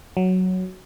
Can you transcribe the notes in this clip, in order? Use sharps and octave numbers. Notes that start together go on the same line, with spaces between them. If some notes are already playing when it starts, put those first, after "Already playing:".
F#3